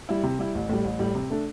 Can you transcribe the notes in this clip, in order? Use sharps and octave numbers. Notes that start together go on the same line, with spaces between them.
G3 E4
C3
G3 E4
A1
A2 G3
A1
A2 G3
C3
A3 D4